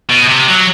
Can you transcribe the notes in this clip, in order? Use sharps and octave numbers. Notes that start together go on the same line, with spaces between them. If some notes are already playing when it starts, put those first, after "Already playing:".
B2
C3
F#3